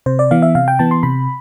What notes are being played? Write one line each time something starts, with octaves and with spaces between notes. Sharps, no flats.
C3 C5
D5
E3 B3 F5
E5
C3 F5
G5
E3 B3 A5
C6
C3 B5